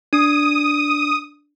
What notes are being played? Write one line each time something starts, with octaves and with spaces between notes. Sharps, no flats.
D4 D#6